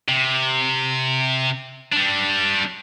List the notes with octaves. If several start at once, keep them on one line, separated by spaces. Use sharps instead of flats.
C3
G3 D4